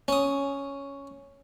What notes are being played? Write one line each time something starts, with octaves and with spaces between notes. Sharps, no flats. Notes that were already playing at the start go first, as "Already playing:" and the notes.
C#4 D#6